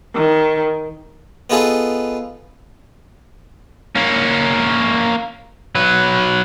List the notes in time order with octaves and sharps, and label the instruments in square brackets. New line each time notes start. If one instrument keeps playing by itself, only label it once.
[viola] D#3
[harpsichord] B3 D#4 F4 G#4 A4 B4
[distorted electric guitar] A#3 C#4
F#3 B4